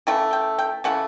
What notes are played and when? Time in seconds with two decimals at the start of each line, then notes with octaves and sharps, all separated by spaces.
0.07 C#3 E3 A3 G5
0.33 G5
0.58 G5
0.84 C#3 E3 A3 F#5